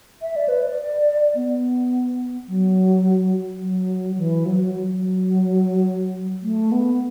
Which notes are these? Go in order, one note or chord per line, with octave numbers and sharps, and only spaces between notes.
E5
D5
B4
D5
B3
F#3
F#3
E3
F#3
F#3
A3
B3